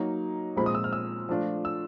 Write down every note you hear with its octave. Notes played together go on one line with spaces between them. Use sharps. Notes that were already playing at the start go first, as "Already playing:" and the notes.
Already playing: F#3 A#3 D#4
A#2 F3 G#3 C4 B5
D#6
E6
F6
E6
F3 A3 D4 F4
E6